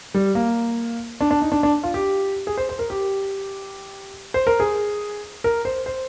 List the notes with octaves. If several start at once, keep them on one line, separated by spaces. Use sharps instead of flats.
G3
A#3
D4
D4
D#4
D4
D4
F4
G4
G#4
C5
C5
A#4
G4
C5
A#4
G#4
A#4
C5
C5